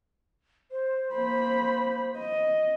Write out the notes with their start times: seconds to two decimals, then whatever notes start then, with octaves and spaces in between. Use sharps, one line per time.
0.72 C5
1.14 A#3 B5
2.18 D#5